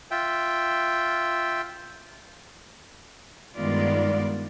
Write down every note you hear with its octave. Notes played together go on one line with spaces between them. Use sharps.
F4 E5 G5
G2 D#3 G#3 B3 F4 D5